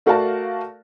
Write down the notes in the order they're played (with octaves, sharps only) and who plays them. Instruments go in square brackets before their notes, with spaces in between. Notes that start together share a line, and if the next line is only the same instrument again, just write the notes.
[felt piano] A3 F#4 A#4 D5 F5 A5